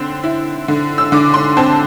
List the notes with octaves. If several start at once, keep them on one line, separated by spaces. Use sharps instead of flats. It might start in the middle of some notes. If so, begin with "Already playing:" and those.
Already playing: D3 C4
E4
D3
E6
D3 D6
C6
C4 A5